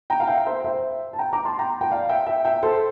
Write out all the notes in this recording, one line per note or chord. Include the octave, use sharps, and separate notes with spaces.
G5 A#5
F5
E5 G5
C5 E5
C5 E5
A5
G5 A#5
A#5 D6
A5 C6
G5 A#5
G5
D5 F5
E5 G5
E5 G5
E5 G5
A4 C5